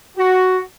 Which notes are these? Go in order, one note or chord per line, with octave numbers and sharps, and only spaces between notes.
F#4